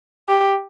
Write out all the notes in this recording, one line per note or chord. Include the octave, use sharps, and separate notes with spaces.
G4